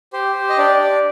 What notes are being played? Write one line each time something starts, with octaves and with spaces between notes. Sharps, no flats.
G4 C5
G4
D#5
D4 D5
D4